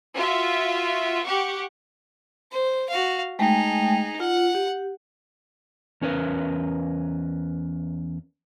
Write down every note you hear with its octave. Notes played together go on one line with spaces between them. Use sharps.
F4 F#4 E5
G4 F#5 C#6
C5
F#4 F5
G#3 A3 D#4 G#4 G5
F4 F#5
G4
E2 C#4 A#4 B4